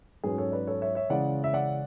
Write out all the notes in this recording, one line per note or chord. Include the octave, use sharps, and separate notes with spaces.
G#2 F#3 C#4 G#4 B4
A4 C#5
B4 D5
A4 C#5
C#5 E5
C#5 E5
C#3 E3 G#3 C#4 D5 F#5
E5
D5 F#5